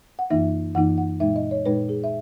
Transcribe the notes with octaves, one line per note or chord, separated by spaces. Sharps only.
F#5
F#2 E3 A#3 D#4 E5
F#2 E3 A#3 D#4 F#5
F#5
A#2 G#3 D#4 E5
D#5
C#5
A#2 G#3 D#4 B4
G#4
E5